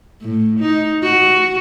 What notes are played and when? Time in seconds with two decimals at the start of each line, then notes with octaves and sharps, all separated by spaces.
0.22 A2
0.60 D#4
1.04 F#4